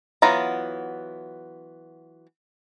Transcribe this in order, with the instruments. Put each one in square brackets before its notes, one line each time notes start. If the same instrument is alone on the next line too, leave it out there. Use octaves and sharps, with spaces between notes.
[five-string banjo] E3 F#3 B3 F4 A#5